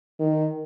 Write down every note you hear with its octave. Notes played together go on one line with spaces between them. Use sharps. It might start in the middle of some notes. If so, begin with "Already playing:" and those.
D#3